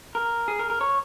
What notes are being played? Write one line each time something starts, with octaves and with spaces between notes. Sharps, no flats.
A#4
G#4
A#4
A#4
C#5